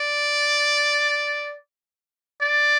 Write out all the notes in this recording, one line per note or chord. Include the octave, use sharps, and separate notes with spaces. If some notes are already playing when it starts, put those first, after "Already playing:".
Already playing: D5
D5